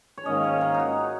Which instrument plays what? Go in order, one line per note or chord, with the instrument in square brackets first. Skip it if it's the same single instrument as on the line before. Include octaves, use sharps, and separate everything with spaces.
[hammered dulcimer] C#5
[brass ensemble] G#2 D#3 A#3 C#4 [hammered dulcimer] D#5
[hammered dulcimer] C#5
A#4
D#4
F#4